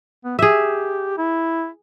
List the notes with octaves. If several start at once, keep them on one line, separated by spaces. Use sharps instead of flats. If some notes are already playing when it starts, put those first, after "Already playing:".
B3
G4 G#4 E5
E4